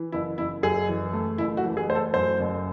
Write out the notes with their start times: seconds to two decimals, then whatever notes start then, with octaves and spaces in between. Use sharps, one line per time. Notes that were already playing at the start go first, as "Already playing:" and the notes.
Already playing: E3
0.12 F#1 E4
0.38 F#1 E4
0.63 F#2 G#4
0.89 E3
1.13 A3
1.38 F#1 E4
1.57 F#4
1.64 E3
1.77 G#4
1.88 A3 C5
1.95 A4
2.14 F#2 C5
2.40 F#1